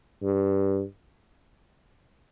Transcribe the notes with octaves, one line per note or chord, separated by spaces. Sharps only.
G2